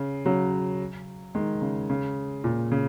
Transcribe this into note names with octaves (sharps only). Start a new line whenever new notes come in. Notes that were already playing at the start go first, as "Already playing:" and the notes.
Already playing: C#3
C#3 F#3
D#3 G#3
C#3
C#3
A#2
C#3